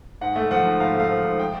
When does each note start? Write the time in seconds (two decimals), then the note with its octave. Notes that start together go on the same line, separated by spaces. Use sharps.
0.21 G#2 F#5
0.36 A3
0.51 F3 F#5
0.65 G#2
0.80 G#2 F5
0.95 A3 F5
1.10 F3
1.25 G#2
1.39 G5